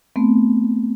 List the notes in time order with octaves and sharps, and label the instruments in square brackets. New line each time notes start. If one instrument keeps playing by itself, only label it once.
[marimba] A3 B3 C4